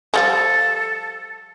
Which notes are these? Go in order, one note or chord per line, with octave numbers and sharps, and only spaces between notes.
F3 G3 G#3 A4